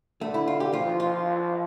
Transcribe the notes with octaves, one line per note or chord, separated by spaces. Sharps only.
D3 A3
E4
F4
G4
F3 F4
F4